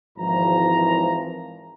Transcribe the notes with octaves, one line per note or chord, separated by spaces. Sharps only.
G#1 E3 F3 A#5